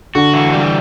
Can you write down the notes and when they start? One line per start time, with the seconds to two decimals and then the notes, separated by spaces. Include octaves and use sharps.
0.15 D3 F#4
0.34 E3
0.53 G3